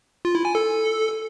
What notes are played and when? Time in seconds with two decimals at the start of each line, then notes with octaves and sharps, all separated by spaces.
0.25 F4
0.35 E4
0.45 G#5
0.55 A4